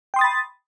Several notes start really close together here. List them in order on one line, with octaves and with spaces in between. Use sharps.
G5 C6 D#6 A6 B5